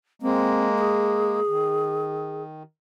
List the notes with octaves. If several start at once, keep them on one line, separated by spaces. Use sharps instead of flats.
G#3 A#3 C4
G#4
D#3